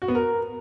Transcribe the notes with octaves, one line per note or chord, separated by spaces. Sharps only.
F#4
B3
A#4